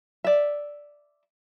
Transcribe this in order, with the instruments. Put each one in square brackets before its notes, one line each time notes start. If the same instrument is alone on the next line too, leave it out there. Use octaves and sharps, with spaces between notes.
[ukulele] D5 E5